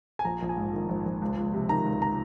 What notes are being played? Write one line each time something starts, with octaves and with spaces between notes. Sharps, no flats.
G#5
A#1 A#5
A#1
G#5
G#2
D#3
A#1
A#1
C#2
C#2
C3
D#3 A#5
C#2
A#5